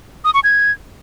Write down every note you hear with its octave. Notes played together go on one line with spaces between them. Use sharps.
D#6
C#6
G#6